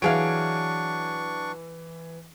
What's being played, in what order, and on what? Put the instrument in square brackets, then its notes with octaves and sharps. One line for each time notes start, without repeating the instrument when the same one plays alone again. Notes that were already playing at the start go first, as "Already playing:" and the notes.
[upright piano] E3 D7 [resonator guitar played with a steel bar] F#3 G#4 F5 [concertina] D4 C#6